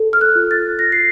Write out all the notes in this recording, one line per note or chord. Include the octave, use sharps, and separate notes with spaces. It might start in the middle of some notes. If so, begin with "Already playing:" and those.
Already playing: A4
F6
F#6
F4
A6
F4 A#6
C7